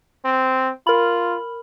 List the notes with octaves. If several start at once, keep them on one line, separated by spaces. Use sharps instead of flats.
C4
F4 A#4 B5